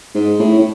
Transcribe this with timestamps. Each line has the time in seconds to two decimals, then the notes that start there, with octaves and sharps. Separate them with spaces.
0.15 G#2
0.40 A2
0.59 A2